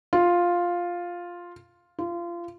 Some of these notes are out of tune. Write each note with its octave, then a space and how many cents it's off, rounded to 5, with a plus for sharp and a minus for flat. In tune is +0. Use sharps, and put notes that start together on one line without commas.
F4 +5
F4 -25